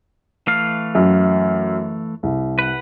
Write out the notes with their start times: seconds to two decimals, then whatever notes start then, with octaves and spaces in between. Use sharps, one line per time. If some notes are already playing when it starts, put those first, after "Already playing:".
0.47 E3 A3 F5
0.95 F#2
2.23 C2
2.59 B4 F#5